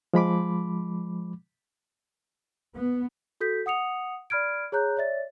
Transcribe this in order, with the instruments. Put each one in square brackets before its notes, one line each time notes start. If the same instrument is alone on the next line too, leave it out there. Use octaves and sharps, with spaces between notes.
[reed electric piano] F3 G#3 B5 D6
[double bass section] B3
[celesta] F#4 A4 G6 B6
F#5 D#6 C#7 F7
D5 B5 F6 G#6 D7
G#4 C#5 A#5 F#6 G6
C#5 D5 E5 A6